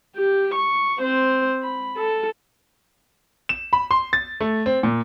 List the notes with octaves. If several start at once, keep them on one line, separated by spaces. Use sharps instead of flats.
G4
C#6
C4 C5
B5
A4
E7
B5
C6
A6
A3
C4
A#2